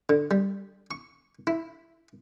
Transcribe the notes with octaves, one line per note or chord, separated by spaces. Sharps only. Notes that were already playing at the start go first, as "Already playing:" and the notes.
D3
G3
C#6
E4